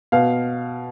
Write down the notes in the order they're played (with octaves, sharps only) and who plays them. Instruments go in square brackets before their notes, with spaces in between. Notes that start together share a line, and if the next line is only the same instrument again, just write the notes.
[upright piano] B2 F5